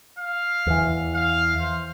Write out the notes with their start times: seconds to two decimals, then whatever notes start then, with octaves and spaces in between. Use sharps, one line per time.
0.19 F5
0.67 E2 E3
1.15 F5
1.60 C5